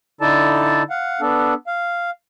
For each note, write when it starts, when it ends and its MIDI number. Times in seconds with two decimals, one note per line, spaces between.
0.21 0.83 50
0.21 0.83 63
0.21 0.83 64
0.21 0.83 69
0.21 0.83 74
0.21 0.83 81
0.90 1.21 77
0.90 1.21 78
1.21 1.54 59
1.21 1.54 62
1.21 1.54 69
1.67 2.10 77